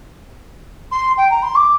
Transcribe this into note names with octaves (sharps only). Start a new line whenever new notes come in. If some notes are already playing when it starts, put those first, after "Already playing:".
C6
G5
A#5
C6
D6